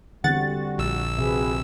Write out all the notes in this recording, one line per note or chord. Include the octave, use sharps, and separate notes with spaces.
E2 D3 G3 C4 F#4 F#5 A6
A#1 E6
C3 C4 F#4 G#4 B4 E5